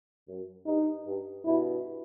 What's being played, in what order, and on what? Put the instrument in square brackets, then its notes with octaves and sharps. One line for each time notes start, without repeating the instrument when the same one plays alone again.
[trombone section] F#2
[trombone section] G2 [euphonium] D#4
[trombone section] G2
[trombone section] G2 B2 [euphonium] E4